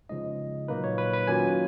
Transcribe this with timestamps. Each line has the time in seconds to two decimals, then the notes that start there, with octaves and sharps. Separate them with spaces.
0.09 C#3 F3 G#3 D#4 D#5
0.68 A#2 F#3 A#3 D#4 B4
0.84 C#5
0.98 B4
1.13 B4
1.27 D#3 F#3 A#3 C#4 F4 G#5